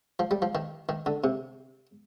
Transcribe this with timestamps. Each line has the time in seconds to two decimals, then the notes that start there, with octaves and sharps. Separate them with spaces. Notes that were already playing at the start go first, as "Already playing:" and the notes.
0.19 F3
0.31 G3
0.42 F3
0.55 D#3
0.89 D#3
1.06 D3
1.24 C3